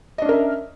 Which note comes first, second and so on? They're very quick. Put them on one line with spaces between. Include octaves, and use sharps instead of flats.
D#5 D4 C#4 A#4 E5